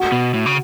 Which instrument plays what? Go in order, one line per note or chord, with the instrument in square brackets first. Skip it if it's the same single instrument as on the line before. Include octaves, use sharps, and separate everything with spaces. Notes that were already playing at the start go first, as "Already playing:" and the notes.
Already playing: [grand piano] F#4
[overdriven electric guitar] B2
A2
C#3